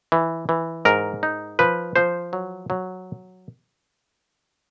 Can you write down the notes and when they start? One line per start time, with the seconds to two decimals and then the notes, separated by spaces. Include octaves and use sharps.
0.12 E3
0.49 E3
0.85 G#2 A#4
1.23 D#4
1.59 F3 B4
1.96 F3 C5
2.33 F#3
2.70 F#3